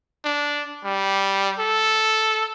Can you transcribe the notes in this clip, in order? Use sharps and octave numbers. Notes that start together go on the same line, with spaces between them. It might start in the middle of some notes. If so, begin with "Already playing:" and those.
D4
G3
A4